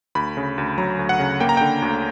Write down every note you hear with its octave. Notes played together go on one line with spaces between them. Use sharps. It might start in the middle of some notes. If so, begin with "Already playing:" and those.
D2 B5
C#3
D2
F#3 A#5
D2
F#5
C#3
A#3 G5
A#5
D3 G5
D2